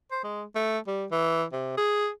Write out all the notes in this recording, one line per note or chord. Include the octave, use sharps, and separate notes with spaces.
C5
G#3
A3
G3
E3
C3
G#4